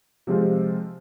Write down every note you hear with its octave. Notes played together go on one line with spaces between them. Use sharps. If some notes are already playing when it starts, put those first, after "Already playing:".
C3 F3 G#3 C4 F4